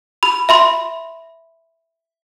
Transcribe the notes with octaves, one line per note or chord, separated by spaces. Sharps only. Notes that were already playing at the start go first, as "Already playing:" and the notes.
B5
E5 B5 C6